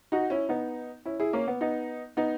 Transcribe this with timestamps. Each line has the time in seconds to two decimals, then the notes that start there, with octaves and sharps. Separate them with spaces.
0.12 D#4 F#4
0.30 C#4 E4
0.49 B3 D#4
1.05 C#4 E4
1.20 E4 G#4
1.33 A#3 C#4
1.48 B3
1.61 B3 D#4
2.17 B3 D#4